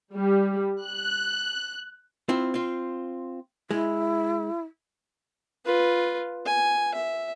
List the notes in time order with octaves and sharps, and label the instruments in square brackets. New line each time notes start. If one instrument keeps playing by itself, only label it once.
[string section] G3
F#6
[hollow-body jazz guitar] C4 E4 F4
C4 F4
[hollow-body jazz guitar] G#3 [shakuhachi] E4
[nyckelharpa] F4 B4
G#5
E5